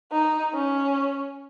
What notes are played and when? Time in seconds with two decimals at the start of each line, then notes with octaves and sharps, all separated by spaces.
0.12 D#4
0.54 C#4